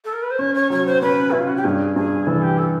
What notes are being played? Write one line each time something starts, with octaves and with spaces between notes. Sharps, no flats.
A4
A#4
B4
C5
C#4 C#5
C#5
F#3 C#5
C5
C#4 B4
C#4 E4
F4
F#4
G4
G2 G#4
G2 G#4
E3 A4
G4
A4